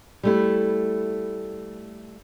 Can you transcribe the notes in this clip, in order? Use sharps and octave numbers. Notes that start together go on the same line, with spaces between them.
G3 A3 E4